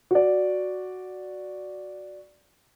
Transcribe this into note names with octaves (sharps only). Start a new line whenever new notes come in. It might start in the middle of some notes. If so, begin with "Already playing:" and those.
F#4 D5